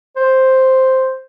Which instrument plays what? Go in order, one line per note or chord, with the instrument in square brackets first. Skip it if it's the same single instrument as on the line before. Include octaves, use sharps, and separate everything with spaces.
[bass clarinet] C5